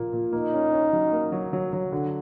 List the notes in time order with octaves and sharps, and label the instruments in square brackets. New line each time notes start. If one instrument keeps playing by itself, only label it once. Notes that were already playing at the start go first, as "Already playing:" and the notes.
Already playing: [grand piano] A#2 F3 A#3
A#2
[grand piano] A#3 [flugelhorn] D#4
[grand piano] C#4
C#4
F#3
A#3
F#3
F#3
F#3
D3